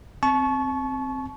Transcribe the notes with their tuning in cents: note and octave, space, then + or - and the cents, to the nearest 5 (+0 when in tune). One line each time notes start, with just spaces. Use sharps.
C4 +0 A5 -35 C#6 +0